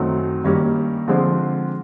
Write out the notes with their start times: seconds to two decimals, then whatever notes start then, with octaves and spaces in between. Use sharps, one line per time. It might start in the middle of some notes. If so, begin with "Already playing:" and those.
Already playing: F#2 D#3 F#3 A3 C4
0.44 G2 D#3 G3 A#3 C#4
1.08 D3 F3 G#3 C4